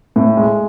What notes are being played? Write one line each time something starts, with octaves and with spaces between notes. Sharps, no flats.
A2
G#3